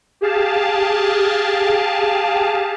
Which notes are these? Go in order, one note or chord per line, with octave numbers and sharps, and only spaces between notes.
G4 G#4 F5 A5